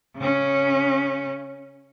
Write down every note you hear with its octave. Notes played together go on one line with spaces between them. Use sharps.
C#3 C#4